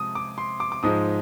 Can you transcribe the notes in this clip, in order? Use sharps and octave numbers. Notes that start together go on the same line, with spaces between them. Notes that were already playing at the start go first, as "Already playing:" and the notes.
Already playing: C3 F3 G#3 D#6
D6
C6
D6
D6
G#2 F3 G#3 D#6